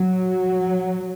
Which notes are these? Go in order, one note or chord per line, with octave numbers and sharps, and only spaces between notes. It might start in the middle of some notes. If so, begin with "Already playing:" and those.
Already playing: F#3